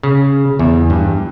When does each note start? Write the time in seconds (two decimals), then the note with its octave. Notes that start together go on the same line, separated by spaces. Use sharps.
0.03 C#3
0.59 E2
0.90 G2